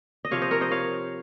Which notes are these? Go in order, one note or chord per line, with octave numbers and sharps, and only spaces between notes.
D#5
C3 F3 C#5 F5
C5 D#5
A#4 C#5
C5 D#5
C#5 F5